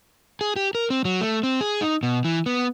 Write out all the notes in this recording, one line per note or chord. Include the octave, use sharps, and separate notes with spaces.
G#4
G4
A#4
C4
F#3
A3
C4
G#4
D#4
B2
E3
B3